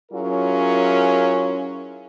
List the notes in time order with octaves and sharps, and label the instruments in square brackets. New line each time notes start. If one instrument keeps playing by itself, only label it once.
[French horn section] F#3 C#4 E4 F4 G#4 A#4